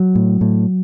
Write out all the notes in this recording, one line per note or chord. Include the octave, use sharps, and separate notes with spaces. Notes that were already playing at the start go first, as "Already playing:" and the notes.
Already playing: F#3
A2
A2